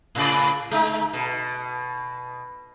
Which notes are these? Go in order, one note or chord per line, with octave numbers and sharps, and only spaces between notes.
A2 C#3 D5
G#3 D#4
B2